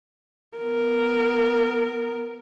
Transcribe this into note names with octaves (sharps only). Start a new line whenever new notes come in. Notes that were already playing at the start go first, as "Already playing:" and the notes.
B3 A#4